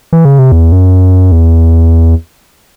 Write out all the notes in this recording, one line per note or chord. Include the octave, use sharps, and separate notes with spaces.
E3
C#3
C3
E2
F#2
E2